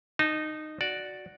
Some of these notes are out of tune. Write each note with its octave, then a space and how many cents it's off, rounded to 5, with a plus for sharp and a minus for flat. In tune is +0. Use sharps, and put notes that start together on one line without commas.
D#4 -15 A5 +0
F#4 +0 D5 +0